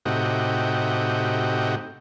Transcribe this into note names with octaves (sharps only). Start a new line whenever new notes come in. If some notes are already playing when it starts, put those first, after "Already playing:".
A2 C3 D#4 F#4 G4